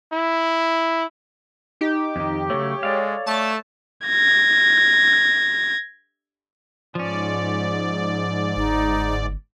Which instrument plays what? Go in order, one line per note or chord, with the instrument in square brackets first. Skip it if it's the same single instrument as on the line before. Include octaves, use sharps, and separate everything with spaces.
[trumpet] E4
[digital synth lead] D#4 [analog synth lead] G4
[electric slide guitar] F2 D#3
[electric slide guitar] C#3 F#3 A3 [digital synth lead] C#5
[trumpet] G#3 [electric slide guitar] A4 D5 F5
[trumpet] A3 [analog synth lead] A5
[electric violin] G#6 A#6
[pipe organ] G#2 D5 [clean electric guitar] F3 C#4
[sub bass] G1 [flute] D#4